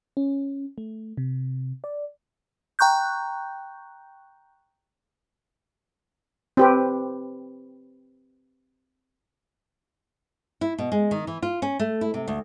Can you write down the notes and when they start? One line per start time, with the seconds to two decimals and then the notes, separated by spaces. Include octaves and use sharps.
0.17 C#4
0.78 A3
1.17 C3
1.84 D5
2.79 G5 A#5 C#6 F#6 G6
6.57 C4 G4 B4
10.61 E4
10.79 B2
10.92 G#3
11.11 D#3
11.27 E3
11.42 F4
11.62 C#4
11.79 A3
12.01 E4
12.14 C3
12.28 D2